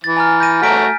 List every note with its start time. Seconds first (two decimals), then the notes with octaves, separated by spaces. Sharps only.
0.04 E3 A6
0.17 G#5 A#5 F6
0.40 G6 A#6 D#7
0.62 A3 F#4 A#5 F6 B6 D7